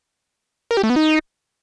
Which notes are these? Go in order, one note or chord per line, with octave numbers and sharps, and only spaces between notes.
A#4
G4
A3
B3
D#4